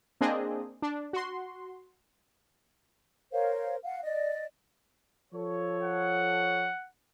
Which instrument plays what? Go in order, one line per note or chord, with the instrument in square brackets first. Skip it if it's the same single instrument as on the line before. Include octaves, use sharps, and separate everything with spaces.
[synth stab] A#3 C4 D4 G#4 D#5
D4
F#4 C6
[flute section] A#4 C5 C#5 F5
F5 F#5
D5 D#5
[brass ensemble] F3 A4 C#5
[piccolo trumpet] F#5